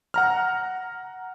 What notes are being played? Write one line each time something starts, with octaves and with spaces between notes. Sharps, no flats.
F#5 A#5 F6